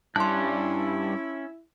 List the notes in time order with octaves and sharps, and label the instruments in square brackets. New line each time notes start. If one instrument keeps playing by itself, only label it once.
[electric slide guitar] G2 G3 [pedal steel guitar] C#4 F#6 [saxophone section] E4 [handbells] A5 C6